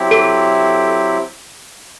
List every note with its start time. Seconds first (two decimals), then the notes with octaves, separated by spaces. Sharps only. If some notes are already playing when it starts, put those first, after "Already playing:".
Already playing: F#3 C4 E4 G4
0.11 A4